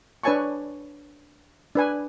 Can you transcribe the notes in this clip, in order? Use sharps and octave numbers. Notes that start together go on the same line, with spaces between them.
D4 B4 C#5 G#5 A5 C#6
D4 B4 G#5